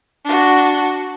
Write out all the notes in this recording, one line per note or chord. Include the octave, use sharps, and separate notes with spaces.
D4 F#4